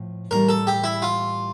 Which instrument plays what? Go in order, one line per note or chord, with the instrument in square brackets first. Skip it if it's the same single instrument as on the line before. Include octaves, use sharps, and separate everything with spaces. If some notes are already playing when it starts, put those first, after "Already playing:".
Already playing: [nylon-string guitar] A2 F3
[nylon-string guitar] A2 E3 G3 A#3 [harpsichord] A#4
[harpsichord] A4
G4
E4
F4